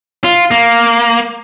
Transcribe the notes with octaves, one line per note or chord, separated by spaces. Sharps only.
F4
A#3